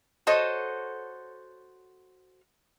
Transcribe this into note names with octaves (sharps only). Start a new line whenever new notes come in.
F#4 A4 C5 C#5 D#5